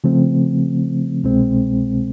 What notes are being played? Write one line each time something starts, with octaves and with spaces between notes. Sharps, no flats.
C#3 F3 A3 C4
C2 B2 G#3 C4